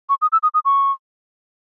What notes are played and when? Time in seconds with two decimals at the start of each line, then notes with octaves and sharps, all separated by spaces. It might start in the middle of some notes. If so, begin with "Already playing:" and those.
0.09 C#6
0.22 D#6
0.32 E6
0.43 D#6
0.54 D#6
0.65 C#6